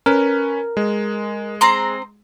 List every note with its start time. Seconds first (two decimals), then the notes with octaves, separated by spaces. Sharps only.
0.06 C#4 A#4 B4
0.77 G#3
1.61 C4 A#5 C6